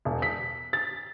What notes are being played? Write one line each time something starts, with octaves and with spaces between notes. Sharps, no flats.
E1
B6
A6